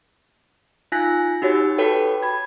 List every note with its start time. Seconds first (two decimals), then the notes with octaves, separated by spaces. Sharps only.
0.92 D#4 F4 G#5 F#6 A#6 B6
1.42 D#4 F#4 G4 C#5 A6
1.78 F#4 A4 B4 C#5 G5
2.23 B5 G#6